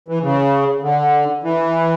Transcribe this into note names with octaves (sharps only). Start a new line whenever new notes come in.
E3
C#3
D3
E3